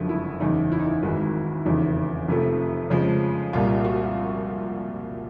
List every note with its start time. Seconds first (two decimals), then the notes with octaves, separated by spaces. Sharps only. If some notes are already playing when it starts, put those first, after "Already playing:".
Already playing: F#1 F2 D3 F3 G#3 F#4
0.09 E4
0.40 F#1 E2 C#3 D#4
0.72 E4
0.79 D#4
0.87 E4
1.03 G#1 G#2 E3 G#3
1.65 F1 E2 C#3 E3 D#4
2.28 F1 F2 C3 F3 A3
2.90 F2 C#3 F3 G#3
3.53 C2 A#2 G3 F4
3.85 F#4